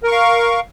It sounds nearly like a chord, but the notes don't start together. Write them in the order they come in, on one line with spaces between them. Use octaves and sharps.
A#4 C#6 F5